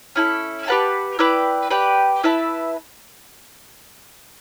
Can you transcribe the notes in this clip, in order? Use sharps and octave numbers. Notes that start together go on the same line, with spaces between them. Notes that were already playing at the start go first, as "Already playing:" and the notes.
C#4 E4 A4
G4 B4 F#5 A5
E4 B4 D5 G5
G4 B4 D5 G5
E4 B4 E5 A5